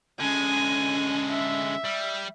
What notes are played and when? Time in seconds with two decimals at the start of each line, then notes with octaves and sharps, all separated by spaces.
0.20 D3 G#3 C#4 G#5
1.30 E5
1.85 G3